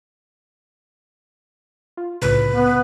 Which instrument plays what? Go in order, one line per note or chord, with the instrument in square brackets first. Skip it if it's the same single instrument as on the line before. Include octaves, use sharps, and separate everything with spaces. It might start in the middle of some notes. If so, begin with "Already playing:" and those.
[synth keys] F4
[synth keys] C2 A2 C#3 [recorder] B4
[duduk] B3